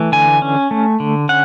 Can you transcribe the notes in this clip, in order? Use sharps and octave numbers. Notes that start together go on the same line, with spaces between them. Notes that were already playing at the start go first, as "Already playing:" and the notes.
Already playing: E3 A3
D3 G#5
C#4
A3
D3
C#4 F#5